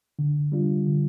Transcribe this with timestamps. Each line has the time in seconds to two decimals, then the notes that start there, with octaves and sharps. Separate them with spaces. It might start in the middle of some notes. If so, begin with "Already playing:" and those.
0.19 D3
0.52 G3 D4 F4
0.87 D3